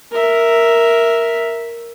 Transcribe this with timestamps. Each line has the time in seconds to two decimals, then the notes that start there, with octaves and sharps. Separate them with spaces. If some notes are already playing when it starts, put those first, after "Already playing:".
0.12 A#4 E5